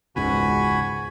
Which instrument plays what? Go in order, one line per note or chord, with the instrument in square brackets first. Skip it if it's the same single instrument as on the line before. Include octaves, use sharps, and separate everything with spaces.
[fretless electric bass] E1 C#2 G#2 [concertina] F#4 G#5 B5